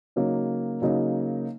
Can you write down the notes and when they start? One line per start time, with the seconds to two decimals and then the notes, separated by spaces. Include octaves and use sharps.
0.16 C#3 F#3 A#3 D#4
0.82 C#3 F#3 A#3 D#4